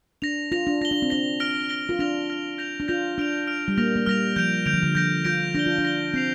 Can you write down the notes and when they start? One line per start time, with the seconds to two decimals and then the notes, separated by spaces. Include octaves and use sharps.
0.22 D4 A#6 F7
0.52 F4 A#6 F7
0.67 D4
0.81 F4 A#6 G7
0.91 D4
1.02 C4
1.10 D4 A#6 G7
1.40 F6 A#6 D7 G7
1.69 F6 A#6 D7 G7
1.89 F4
1.99 D4 F6 A#6 F7
2.30 F6 A#6 F7
2.58 G6 A#6 F7
2.80 D4
2.88 F4 G6 A#6 F7
3.18 D4 F6 D7 F7
3.47 F6 D7 F7
3.68 G3
3.78 A#3 F6 A#6 F7
3.96 A#3
4.06 G3 F6 A#6 F7
4.36 F3 G6 D7 F7
4.66 D3 G6 D7 F7
4.74 F3
4.83 D3
4.95 F3 G6 A#6 D7
5.25 F4 G6 A#6 D7
5.55 D4 A#6 G7
5.66 F4
5.78 D4
5.85 A#6 G7
6.14 C4 G6 C7 F7